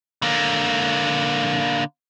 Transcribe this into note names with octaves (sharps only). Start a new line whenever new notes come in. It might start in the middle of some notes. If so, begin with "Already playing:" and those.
D3 A#3